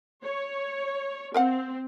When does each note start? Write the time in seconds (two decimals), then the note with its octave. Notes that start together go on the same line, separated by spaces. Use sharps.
0.23 C#5
1.34 C4 A#4 F5 F#5